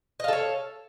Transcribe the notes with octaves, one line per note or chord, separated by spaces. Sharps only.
A4 C#5 D#5 F5